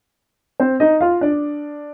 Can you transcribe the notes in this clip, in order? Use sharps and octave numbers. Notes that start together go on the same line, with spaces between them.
C4 C5
D#4 D#5
F4 F5
D4 D5